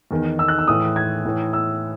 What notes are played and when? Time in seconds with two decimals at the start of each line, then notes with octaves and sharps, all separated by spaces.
0.11 E2 D#3
0.39 E6
0.48 F#6
0.59 E6
0.68 A2 E3 D#6
0.96 G#6
1.25 A2 E3
1.53 E6